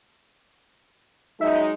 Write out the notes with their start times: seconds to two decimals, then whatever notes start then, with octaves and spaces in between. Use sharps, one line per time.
1.41 F#3 G#3 D#4 E5